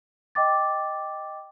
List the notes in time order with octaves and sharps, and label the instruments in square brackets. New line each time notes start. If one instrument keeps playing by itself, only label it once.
[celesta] D#5 G5 D6 A6